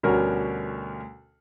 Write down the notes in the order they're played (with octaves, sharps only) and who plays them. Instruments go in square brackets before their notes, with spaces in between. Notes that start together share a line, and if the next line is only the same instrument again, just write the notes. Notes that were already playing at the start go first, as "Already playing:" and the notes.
[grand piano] D2 B2 G3 C#4 F#4 A#4